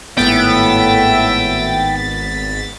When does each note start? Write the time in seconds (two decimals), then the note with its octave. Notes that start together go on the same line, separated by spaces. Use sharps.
0.17 G#1 A2 B3 E5 G5 A6 B6